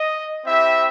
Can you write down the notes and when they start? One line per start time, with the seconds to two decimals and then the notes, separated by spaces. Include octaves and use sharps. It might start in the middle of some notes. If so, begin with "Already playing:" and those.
Already playing: D#5
0.45 C4 E4 G4 E5